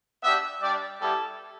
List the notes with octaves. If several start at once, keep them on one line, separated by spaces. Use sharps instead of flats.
B3 D4 G4 E5
G3 D4 G4 D5
G3 B3 E4 G4 A4